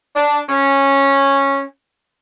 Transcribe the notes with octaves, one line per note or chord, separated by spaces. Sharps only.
D4
C#4